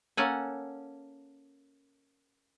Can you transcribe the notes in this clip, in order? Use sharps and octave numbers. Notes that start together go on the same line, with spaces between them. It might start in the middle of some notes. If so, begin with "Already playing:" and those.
A#3 C#4 A4 F#5 G#5